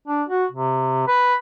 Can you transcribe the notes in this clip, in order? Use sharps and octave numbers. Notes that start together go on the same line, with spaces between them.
D4
F#4
C3
B4